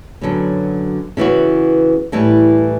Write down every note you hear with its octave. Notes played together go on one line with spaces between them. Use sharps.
F#2 D3 F#3 B3
C#3 E3 B3 F#4
A2 E3 G3